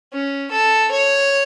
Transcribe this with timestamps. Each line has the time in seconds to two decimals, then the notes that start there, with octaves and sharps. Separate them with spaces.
0.13 C#4
0.51 A4
0.91 C#5